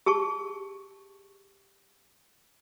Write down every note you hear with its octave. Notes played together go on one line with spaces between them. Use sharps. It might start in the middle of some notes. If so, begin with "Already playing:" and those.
G4 G#4 A5 C#6